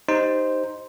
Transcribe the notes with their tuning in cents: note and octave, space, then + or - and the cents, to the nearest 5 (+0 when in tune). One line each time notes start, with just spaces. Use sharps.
D#4 +0 G4 +0 C5 +0